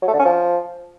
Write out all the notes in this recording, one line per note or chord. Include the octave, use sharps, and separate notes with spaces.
F#3
A3
D3
C#4
F3